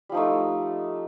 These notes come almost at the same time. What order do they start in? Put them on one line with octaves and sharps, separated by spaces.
G3 F3 D#4 A3